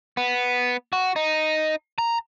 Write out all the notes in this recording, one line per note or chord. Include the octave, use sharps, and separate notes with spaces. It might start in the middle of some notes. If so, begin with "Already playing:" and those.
B3
F#4
D#4
A#5